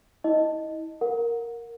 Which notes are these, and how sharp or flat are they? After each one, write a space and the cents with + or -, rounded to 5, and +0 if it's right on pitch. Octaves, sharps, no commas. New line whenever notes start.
E4 -35 D#5 +0
A#4 +0 F#5 -30